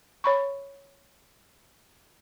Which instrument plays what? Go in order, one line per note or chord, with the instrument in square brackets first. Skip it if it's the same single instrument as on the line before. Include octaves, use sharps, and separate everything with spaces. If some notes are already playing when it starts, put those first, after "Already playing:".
[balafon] C#5 B5 C#6